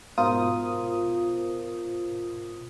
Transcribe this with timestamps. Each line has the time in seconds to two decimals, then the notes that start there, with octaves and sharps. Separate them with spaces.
0.18 G#2 B2 F4 A#4 C5 D#6